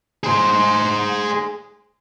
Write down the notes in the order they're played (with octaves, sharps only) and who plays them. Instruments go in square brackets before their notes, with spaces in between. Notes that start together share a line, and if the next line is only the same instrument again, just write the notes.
[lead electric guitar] G#4 C5